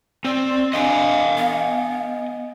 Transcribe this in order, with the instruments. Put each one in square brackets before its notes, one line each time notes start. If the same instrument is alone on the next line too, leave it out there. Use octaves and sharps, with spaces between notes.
[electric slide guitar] C4 [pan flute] D5
[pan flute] D4 [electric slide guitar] D#5 G5 G#5 [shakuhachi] F5
[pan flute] B3